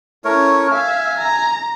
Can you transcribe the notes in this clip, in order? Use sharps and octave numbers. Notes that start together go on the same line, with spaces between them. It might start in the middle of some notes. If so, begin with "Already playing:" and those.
A3 C#4 E4 A#4 C#5
E5 F5 G#5
A#5